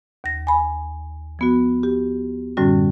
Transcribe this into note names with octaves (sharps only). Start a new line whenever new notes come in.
D#2 A#6
G#5 B5
F3 B3 F#4
G4
F#2 A2 D3 G3 C#4 F#4